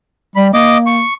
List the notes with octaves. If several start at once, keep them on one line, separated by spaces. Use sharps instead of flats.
G3 B5
A#3 D#5 D6
C#6